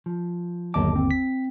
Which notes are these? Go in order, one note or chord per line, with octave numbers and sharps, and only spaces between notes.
F3
G1 D#2 F#3 D#5 A5 D6
C4
B6